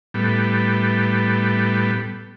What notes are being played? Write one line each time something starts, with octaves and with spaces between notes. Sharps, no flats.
A2 G3 B3